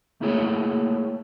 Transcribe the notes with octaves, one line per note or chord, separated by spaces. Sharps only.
A3 A#3 E4 G#4 C#5